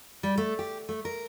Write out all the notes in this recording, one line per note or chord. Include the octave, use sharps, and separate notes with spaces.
G3
A3
G4
A3
A#4